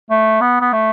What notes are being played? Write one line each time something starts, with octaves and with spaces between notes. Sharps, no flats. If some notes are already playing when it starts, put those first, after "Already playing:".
A3
B3
B3
A3